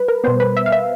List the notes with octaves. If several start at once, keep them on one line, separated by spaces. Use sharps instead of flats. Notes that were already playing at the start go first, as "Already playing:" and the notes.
Already playing: G3 B4
A#4
B2 G3 B3 C5
B4
E5
F5
E5